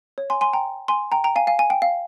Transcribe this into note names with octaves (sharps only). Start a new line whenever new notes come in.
C#5
G#5 C6
G#5 C6
G5 A#5
G#5 C6
G5 A#5
G5 A#5
F5 G#5
F5 G#5
G#5
G5
F5